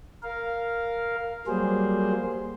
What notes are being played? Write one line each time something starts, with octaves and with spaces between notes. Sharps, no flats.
A#4 F5
F#3 G3 A#3 G#4 C5